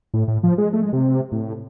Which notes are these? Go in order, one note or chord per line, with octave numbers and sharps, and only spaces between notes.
A2
A2
F3
G#3
A3
G#3
C3
A2